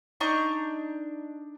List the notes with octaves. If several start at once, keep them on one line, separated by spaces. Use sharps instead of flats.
D4 D#4 A#5 C#6